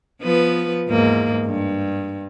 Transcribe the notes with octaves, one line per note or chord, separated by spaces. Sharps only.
F3 B3 B4
E2 G#2 A#3
G2